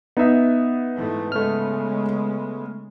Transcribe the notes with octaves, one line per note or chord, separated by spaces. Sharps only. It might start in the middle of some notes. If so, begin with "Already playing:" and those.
B3 D#4 E5
G#2 E3 A3
C#3 G#3 A3 F6